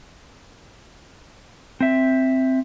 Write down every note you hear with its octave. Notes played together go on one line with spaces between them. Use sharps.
C4 E5